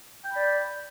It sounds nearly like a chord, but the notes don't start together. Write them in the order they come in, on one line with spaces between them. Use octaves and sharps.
G5 B5 D5